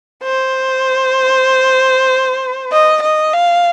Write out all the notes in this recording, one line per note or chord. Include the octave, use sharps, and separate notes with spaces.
C5
D#5
D#5
F5